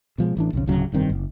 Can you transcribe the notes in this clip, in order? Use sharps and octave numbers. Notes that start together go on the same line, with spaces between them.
B2 F3 G#3
A1 E3 D4
B1 F2 C#3
D1 C#3 F#3
F1 G2 D#3 C4
F#1